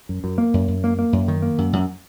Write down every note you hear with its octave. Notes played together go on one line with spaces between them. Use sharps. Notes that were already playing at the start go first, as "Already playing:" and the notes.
F#2
F#2
A#3
F#2
F#2
A#3
A#3
F#2
D#3
A#3
F#2
F#2